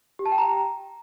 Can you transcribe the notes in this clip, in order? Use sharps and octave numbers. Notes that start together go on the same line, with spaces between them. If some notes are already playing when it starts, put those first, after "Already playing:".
G4
A5
G5
A#5